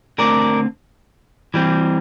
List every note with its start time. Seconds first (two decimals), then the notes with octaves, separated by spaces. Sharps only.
0.18 D3 A3 C4 A#4 D5
1.54 E3 G3 C4